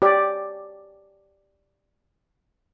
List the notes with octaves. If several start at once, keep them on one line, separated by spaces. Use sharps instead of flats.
G4 C#5 D5